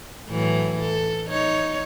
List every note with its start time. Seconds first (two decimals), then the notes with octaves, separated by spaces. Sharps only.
0.29 A2 E3 F#3
0.80 A4
1.28 D#4 C#5